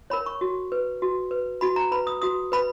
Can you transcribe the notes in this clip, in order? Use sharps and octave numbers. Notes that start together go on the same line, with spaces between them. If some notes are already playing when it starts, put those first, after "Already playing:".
A#4 C#5 B5
C#6
F#4
B4
F#4
B4
F#4 B5
A#5
B4 B5
D#6
F#4 D#6
B4 B5